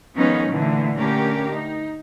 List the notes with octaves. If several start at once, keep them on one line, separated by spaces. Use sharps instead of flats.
D#3 F3 G#3 B3 C#4 D#4
A#2 D3 E3 A3
D3 A3 C#4 G4 A#4
D#4